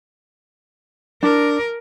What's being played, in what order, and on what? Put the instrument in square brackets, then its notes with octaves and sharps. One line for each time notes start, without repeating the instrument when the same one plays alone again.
[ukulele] D4 [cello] A#4